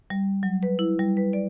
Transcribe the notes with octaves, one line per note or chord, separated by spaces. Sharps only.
G3
F#3
B4
E4
G3
B4
D5